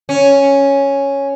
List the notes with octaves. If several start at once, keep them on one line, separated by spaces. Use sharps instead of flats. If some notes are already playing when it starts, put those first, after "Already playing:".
C#4